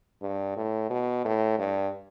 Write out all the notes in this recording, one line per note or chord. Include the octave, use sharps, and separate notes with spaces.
G2
A2
B2
A2
G2